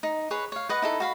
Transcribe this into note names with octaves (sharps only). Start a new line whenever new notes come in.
D#4
G#4 B4 C#5
C#5 F5
B4 D#5 F#5
D#4 E4 A4
F#4 F5 B5